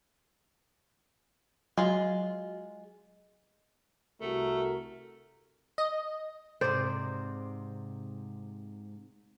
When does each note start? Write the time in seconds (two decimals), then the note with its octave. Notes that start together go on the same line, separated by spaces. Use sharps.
1.77 F#3 G#3 F4
4.21 C2 A3 F#4 A#4
5.78 D#5
6.61 G#2 C3 C5 D5